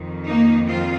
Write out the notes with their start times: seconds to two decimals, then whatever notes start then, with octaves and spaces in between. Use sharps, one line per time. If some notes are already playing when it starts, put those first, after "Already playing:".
Already playing: F2 D#3
0.28 A#3 D#4
0.67 C4 F4